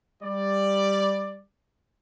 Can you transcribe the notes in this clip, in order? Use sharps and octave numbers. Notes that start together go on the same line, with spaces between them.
G3 D5